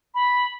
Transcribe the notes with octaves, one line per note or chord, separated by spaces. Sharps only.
B5